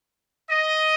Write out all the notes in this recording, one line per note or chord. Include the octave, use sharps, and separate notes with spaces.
D#5